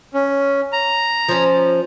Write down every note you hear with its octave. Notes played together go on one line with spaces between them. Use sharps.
C#4
A#5
F3 C#4